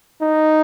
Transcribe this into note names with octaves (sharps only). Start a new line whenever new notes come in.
D#4